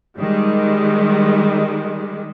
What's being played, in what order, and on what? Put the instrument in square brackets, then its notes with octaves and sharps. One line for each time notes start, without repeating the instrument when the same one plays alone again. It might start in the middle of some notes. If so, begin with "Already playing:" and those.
[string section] D#3 G3 G#3